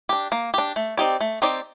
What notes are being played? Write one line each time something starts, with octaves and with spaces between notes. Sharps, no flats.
D4 G4
A#3
D4 G4
A3
C4 D#4 G4 D5
A3
C4 D#4 G4 D5